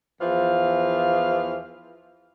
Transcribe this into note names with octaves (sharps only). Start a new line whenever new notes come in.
E2 E3 F3 F5